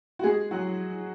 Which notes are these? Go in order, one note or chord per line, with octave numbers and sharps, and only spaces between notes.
F#4
G#3 G#4
F#3 F#4